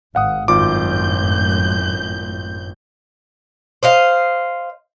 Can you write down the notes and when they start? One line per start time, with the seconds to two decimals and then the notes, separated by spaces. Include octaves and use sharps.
0.15 G#1 F5 F#5 D#6
0.48 G#1 F#2 A2 F4 D6 G6
3.83 C5 D#5 F5